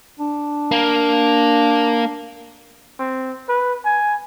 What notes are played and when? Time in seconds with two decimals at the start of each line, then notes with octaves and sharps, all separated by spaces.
0.20 D4
0.72 A#3
2.99 C4
3.48 B4
3.84 G#5